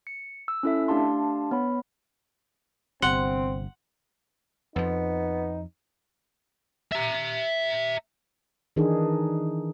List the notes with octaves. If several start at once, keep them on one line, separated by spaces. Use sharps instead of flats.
C#7
E6
C#4 E4 A4 E5
A3 D4 G4 F5 A5 C6
B3 C#5 B5
G1 C3 C4 F#5 C6
F2 F3 B3 D#4
E5 A#5
D#3 E3 D4 D#4 G#4 A#4